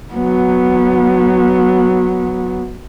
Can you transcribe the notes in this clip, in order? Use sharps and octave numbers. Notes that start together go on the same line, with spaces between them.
F#3 B3